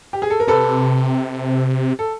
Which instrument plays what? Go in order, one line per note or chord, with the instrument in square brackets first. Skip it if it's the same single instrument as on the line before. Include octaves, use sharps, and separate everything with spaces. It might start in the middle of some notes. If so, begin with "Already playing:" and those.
[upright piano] G4
G#4
A4
A#4
[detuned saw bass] C3 [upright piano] A4 B4
[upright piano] A4